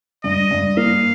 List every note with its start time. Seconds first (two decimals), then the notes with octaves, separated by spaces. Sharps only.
0.24 G2 D#5
0.51 G2
0.77 A#3 F5